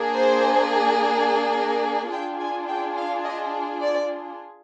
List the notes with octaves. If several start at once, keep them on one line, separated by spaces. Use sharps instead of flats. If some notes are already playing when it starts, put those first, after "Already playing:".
Already playing: A#3 D4 G#4
C5
A#4
D4 F4 G#4 G5
G#5
G5
F5
D#5
D5